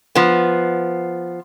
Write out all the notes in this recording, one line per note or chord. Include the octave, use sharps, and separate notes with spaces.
F3 B3